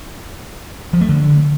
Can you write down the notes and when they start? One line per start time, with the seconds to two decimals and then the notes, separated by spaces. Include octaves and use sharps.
0.93 F3
1.01 A3
1.09 D3